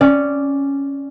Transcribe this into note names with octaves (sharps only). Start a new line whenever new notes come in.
C#4 D5